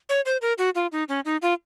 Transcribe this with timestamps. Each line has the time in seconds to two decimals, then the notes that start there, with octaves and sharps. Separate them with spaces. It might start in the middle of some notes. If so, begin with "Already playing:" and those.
0.09 C#5
0.26 C5
0.42 A#4
0.58 F#4
0.75 F4
0.92 D#4
1.09 C#4
1.25 D#4
1.42 F4